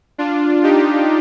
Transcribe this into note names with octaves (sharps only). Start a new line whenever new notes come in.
D4 F4
D#4 G4